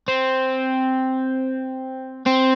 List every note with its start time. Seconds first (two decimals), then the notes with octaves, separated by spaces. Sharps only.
0.08 C4
2.26 C4